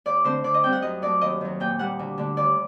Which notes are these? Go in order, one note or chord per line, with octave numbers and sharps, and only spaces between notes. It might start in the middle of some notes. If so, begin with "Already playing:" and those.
D#2 D5
D3 A3 C4 C5
D3 D5
D#5
G3 C4 D#4 G5
F#5
F#2 D#5
F#3 A3 D5
D#2 D#5
D#3 F#3
A#2 G5
G3 A#3 F#5
D2
D3 A3 D4
D#2 D5